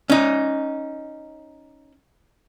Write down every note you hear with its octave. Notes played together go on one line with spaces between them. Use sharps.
C#4 D#4